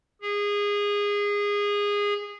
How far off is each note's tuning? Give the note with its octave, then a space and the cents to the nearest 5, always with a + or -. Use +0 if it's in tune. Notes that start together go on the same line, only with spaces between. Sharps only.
G#4 -20